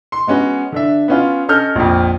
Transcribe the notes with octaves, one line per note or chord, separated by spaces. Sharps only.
C6
G#3 B3 C#4 F#4
D3 D4 E5
B3 C#4 F4
C#4 A4 D#5 F6 G6
A#1 F2